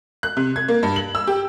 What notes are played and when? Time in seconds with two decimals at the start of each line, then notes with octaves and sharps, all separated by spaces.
0.23 F#6
0.37 C3
0.56 G#6
0.68 A#3
0.83 G2
0.96 F#7
1.15 E6
1.27 G4